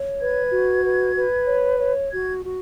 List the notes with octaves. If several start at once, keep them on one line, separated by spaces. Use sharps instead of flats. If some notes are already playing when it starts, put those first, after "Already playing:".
Already playing: C#5
B4 G#6
F#4
B4
B4
C#5
C#5
F#4 G#6
F#4